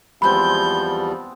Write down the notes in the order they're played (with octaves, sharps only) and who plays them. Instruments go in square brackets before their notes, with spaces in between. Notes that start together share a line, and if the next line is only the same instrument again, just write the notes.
[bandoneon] E2 F3 G3 [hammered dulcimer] G#3 B3 C4 [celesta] B5 [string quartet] G6